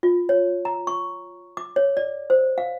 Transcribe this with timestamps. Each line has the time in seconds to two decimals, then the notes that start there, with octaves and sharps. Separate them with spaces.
0.03 F4
0.29 C#5
0.65 A#5
0.87 C#6
1.57 D6
1.76 C#5
1.97 D5
2.30 C5
2.58 F5